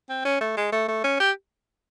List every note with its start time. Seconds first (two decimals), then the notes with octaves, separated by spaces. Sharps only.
0.09 C4
0.25 C#4
0.41 A3
0.57 G#3
0.72 A3
0.88 A3
1.04 C#4
1.20 G4